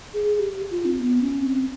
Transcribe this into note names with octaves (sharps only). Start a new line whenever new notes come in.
G#4
G#4
G4
F4
C4
B3
C#4
C4